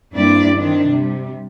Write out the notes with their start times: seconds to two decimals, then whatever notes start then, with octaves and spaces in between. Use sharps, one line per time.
0.14 G2 A#3 C4 D4 E4 D5
0.56 D#3 C4 D4
0.89 C3 G3